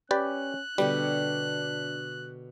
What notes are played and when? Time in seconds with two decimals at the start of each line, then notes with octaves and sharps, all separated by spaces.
0.11 C#4 G4 B4 D5 F#6
0.78 B2 D3 G3 D4 G4